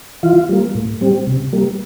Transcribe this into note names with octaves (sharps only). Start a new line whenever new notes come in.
E3 F4
G3 A#3
A2
G3 C4
C3
G3 A#3